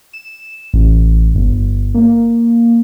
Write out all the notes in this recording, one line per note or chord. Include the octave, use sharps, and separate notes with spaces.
E7
A1
G1
A#3